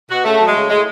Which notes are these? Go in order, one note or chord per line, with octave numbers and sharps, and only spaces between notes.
B2 F#4
C#3 A3
F#3
G#3
C#3
A2 G#3